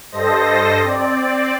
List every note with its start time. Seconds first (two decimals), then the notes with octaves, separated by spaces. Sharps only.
0.11 G2 A4 C5 D#5 A#6
0.81 C4 D5